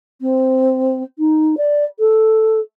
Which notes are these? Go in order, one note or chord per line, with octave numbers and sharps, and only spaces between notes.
C4
D#4
D5
A4